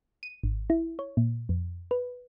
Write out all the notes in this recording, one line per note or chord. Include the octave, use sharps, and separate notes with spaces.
D#7
G#1
E4
C#5
A#2
F2
B4